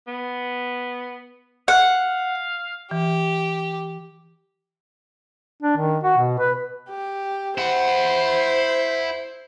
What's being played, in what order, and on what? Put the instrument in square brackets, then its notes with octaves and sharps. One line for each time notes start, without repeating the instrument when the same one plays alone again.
[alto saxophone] B3
[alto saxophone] F5 [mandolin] F#5
[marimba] E3 [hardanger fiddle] G4
[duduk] D4
D#3
F#4
B2
B4
[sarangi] G4
[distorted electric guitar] E4 F#5 [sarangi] C5